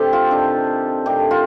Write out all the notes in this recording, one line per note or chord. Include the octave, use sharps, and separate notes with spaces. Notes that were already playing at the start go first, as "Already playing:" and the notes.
Already playing: C3 A3 D4 G4 A4 C5
F4
C3 D#3 A3 D4
C3 D#3 A3 D4 G4
F4